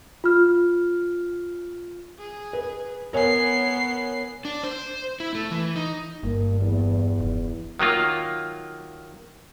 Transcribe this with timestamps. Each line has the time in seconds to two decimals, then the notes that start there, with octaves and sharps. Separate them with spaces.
0.24 F4 F6
2.18 G#4
2.53 B4
3.13 B3 A#4 C#5 G#5 C7
4.45 D4
4.63 C5
5.20 E4
5.35 A3
5.51 E3
5.76 D#4
6.23 G1 G2 A#3
6.61 E2
7.20 F1
7.79 D#3 F#3 A#3 F4